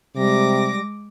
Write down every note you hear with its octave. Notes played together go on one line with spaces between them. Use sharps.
C3 G3 G#3 D6 A#6